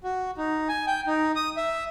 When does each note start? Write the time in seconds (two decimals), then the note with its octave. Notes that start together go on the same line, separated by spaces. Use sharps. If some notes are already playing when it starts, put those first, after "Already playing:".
0.04 F#4
0.37 D#4
0.69 G#5
0.87 G5
1.07 D#4
1.36 D#6
1.57 E5